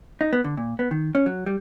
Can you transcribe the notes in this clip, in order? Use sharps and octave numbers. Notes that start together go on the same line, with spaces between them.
D#4
B3
D3
A#2
B3
D#3
C#4
F#3
G3